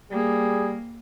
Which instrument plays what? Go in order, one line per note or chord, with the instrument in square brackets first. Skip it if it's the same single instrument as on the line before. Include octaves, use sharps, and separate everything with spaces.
[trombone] G3 [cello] A#3 [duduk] G#4